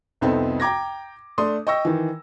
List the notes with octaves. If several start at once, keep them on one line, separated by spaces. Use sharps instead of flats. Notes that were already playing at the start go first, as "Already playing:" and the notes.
C2 F2 B3 C4 D#4 A4
G5 A#5 D6 G#6 A#6
A3 D4 C6 D#6
D#5 G5 C#6 E6 A#6
D#3 E3